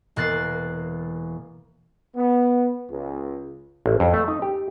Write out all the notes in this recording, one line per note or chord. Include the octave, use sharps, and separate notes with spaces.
E1 A#3 F#6 A6 C7
B3
C#2
A1
F2
A3
D#4
G4